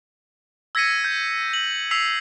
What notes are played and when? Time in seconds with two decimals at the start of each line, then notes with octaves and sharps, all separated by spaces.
0.75 E6 G#6 A#6 B6 C#7 D#7
1.04 G6
1.53 F#7
1.91 E6 B6 C7 F7